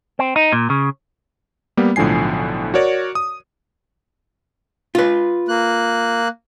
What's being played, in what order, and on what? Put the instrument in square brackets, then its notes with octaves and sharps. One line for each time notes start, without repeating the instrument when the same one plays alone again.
[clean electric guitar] C4
D#4
A#2
C#3
[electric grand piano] G3 A#3 B3
B1 A2 D3 F3 G#5 C7
F#4 A#4 C#5 D5
D#6
[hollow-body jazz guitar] F4 B4
[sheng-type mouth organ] A#3 F#6